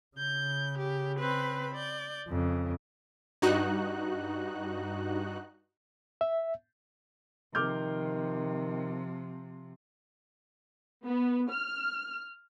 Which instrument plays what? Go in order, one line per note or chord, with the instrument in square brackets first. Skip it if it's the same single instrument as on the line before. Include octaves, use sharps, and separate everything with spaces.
[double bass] C#3 [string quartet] G6
[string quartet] G4
C4 B4 B5
D5 G6
[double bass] F2 [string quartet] C#3
[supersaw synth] G2 D#4 F#4 F#6
[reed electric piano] E5
[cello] C3 F3 [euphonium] D#3 [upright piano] D6 F6 G6
[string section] B3
F6